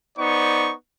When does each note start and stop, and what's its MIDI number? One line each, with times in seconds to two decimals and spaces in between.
0.17 0.73 59
0.17 0.73 63
0.17 0.73 72
0.17 0.73 74
0.17 0.73 85